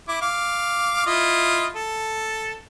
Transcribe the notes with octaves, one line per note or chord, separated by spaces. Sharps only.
E4 D6
F5 D6
E4 F4 D#5
A4